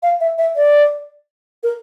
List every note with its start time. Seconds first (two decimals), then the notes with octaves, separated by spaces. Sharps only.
0.03 F5
0.21 E5
0.38 E5
0.56 D5
1.63 A#4